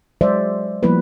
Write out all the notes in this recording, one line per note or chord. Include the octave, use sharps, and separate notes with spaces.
F#3 G#3 C5 D5 E5
F3 G3 A#3 B3 E4 B4